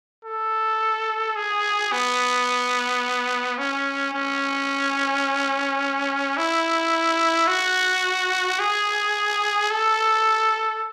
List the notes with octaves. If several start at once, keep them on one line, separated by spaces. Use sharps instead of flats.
A4
G#4
B3
C#4
C#4
E4
F#4
G#4
A4